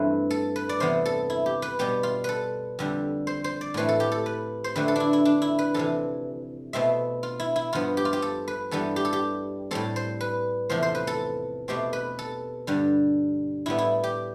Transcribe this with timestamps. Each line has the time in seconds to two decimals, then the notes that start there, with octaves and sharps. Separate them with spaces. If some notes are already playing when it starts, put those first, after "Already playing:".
Already playing: G2 E3 A3 C4 B4
0.31 A4
0.56 B4
0.69 D5
0.80 E2 C3 E3 B3 C5
1.06 A4
1.30 E4
1.46 G4
1.62 B4
1.79 B2 G3 B3 G4
2.03 F4
2.24 A4 B4
2.79 F2 D3 G3
3.27 C5
3.44 C5
3.61 D5
3.74 A2 E3 A3 C4 B4
3.89 A4
4.00 G4
4.12 A4
4.26 B4
4.64 C5
4.75 F2 D3 A3 C4 B4
4.88 A4
4.96 D4 E4
5.13 E4
5.25 D4
5.42 E4
5.59 B4
5.74 F2 C3 E3 A4
6.73 B2 A3 C4 E5
7.23 F4
7.40 E4
7.56 E4
7.73 G2 F3 B3 F4
7.97 G4
8.05 F4
8.13 G4
8.22 A4
8.48 B4
8.71 G2 E3 G3 B3 A4
8.96 G4
9.05 A4
9.13 G4
9.71 A2 G3 C4 A4
9.96 C5
10.21 B4
10.69 E2 C3 F3 A3 C5
10.83 C5
10.95 B4
11.07 A4
11.68 B2 A3 C4 G4
11.93 B4
12.19 A4
12.67 G2 D3 G3
13.66 A2 G3 B3 E4
13.78 E4
14.04 G4